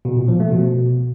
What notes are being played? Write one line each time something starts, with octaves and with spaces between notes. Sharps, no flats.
B2
A#2
F3
A3
B2